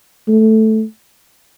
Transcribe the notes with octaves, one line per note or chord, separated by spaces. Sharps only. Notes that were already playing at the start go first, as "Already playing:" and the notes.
A3